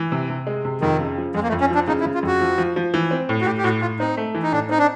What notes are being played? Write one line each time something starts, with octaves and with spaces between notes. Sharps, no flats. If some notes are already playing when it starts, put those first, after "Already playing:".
Already playing: E3
C3
C3
G#3
C3
F2 D#3
C#3
F3
F2 G#3
A#3
A3
F2
C#4
F3 D4
C#3 D#4
E4
C#3
F4
F2 F#4
F3
F3
F3
E3
C4
A2
F#4
A2 G4
G4
A2 F#4
A2 F4
C4 D#4
A3
E3
D#4
A2 D4
C4 D#4
D4